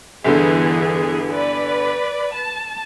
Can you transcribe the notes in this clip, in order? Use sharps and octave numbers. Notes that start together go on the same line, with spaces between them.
G1 D3 E3 B3 G#4
B4 D5
A5